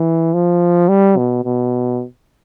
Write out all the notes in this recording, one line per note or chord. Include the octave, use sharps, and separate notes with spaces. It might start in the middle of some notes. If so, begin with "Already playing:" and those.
Already playing: E3
F3
G3
B2
B2